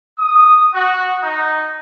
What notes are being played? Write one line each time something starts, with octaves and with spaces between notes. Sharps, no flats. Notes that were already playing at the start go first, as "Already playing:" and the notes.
D#6
F#4
D#4